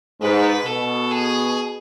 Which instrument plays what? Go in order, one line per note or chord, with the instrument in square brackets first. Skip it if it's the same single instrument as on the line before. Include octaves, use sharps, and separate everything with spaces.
[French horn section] G#2 [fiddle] B4
[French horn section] B2 [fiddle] A4
[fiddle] G#4